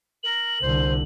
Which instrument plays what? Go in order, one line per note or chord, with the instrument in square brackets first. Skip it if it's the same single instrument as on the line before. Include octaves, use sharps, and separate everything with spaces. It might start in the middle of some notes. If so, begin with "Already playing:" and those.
[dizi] A#4 [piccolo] F#7
[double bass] C2 D3 [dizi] C5